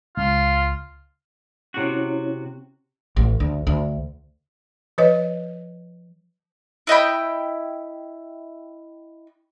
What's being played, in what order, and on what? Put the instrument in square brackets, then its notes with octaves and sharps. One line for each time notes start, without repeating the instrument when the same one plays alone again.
[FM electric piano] C#2 [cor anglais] F4
[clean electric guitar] C3 F#4 [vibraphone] C#4 E4 C#5
[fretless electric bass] A1
D2
D2
[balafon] F3 B4 C#5 D#5
[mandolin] E4 D#5 G5 B5